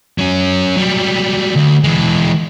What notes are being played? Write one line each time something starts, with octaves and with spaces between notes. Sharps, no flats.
F#3 C#4
F#3 G3
D2
E3 G#3